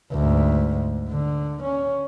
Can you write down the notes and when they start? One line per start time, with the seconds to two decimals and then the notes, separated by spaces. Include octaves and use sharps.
0.12 D2 G#2
1.09 D3
1.64 C#4